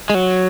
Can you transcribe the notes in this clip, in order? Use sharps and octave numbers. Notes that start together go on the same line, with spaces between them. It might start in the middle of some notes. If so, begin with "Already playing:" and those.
G#3
F#3